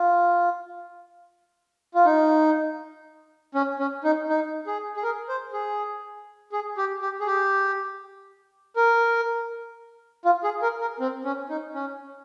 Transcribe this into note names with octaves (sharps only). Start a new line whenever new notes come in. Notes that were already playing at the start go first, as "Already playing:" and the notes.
Already playing: F4
F4
D#4
C#4
C#4
D#4
D#4
G#4
G#4
A#4
C5
G#4
G#4
G4
G4
G#4
G4
A#4
F4
G#4
A#4
A#4
C4
C#4
D#4
C#4